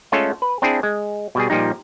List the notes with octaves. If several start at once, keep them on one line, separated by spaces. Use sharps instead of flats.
G#3 A3 C#4 F4 A4
B4
C4 D4 E4 G#4
G#3
B2 G3 G#4
A#2 F3 G3 D#4